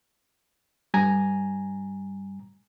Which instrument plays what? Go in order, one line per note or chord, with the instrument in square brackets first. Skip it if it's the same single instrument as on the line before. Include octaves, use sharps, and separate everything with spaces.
[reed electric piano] G2 G3 G#5 A#5